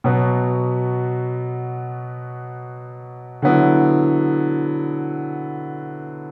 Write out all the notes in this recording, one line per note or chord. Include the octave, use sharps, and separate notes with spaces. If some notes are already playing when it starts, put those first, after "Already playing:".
B2 F#3 B3
D3 F#3 B3 E4